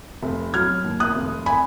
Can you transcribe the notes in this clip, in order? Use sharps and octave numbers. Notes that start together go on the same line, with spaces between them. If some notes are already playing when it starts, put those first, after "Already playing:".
F1
F#3 F6 G#6
D#2
D#6 F#6
F1
G#5 B5